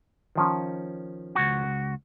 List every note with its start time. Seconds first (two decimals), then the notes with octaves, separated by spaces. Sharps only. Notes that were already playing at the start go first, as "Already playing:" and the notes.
0.35 D#3 F3 C#4
1.35 C#2 F#4